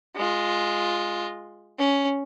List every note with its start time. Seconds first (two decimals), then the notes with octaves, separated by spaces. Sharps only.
0.17 G#3 F4
1.78 C#4